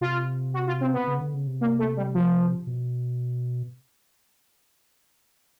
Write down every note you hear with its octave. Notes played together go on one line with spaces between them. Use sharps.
C3 F4
F#4
F4
C4
B3
C#3
D3
C#3
C3
A#3
A3
G3
F3
B2